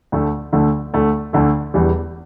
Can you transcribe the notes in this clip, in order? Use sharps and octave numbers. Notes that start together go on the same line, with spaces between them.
D2 D3 A3
D2 D3 A3
D2 D3 A3
D2 D3 A3
E1 E2 E3 G3